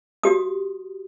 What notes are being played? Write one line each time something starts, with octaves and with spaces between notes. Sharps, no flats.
F#4 G4 D#6